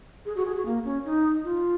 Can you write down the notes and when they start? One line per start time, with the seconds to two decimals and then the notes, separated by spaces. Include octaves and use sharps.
0.26 G#4
0.36 F#4
0.45 G#4
0.56 F#4
0.66 A#3
0.85 C#4
1.05 D#4
1.44 F4